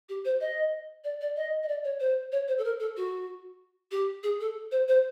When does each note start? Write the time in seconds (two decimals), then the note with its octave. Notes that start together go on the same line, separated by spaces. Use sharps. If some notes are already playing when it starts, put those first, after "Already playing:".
0.09 G4
0.25 C5
0.41 D#5
1.04 D5
1.21 D5
1.36 D#5
1.63 D#5
1.68 D5
1.84 C#5
2.00 C5
2.32 C#5
2.48 C5
2.58 A4
2.64 A#4
2.80 A4
2.97 F#4
3.91 G4
4.23 G#4
4.41 A4
4.72 C5
4.88 C5